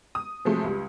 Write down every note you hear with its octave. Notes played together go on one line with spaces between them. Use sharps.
D#6
C3 F3 F#3 G#3 A3
C#2 G3